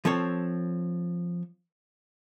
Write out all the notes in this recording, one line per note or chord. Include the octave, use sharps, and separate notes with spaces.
F3 C4 A4 C#5